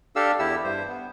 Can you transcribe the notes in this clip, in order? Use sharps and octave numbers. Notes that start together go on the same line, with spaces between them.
D4 G4 A4 F5 E6
E2 E4 G4 E6
G2 C5
B3